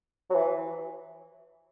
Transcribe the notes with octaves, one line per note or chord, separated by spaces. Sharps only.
F#3
E3